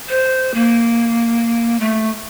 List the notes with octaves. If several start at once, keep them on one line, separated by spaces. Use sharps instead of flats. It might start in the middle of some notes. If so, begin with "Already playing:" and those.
C5
A#3
A3